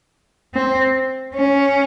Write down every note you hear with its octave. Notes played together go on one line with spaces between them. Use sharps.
C4
C#4